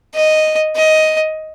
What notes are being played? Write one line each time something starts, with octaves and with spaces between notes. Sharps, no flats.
D#5
D#5